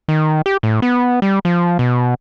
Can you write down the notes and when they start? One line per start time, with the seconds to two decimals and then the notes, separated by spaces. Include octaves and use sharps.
0.08 D#3
0.46 G4
0.63 A2
0.82 B3
1.22 G3
1.45 F3
1.79 B2